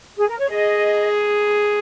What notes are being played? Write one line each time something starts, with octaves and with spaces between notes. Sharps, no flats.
G#4
A#4
C#5
G#4 D#5